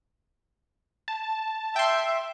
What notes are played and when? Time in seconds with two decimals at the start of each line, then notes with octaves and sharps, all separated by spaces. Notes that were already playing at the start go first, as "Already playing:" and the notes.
1.08 A5
1.76 E5 G5 C6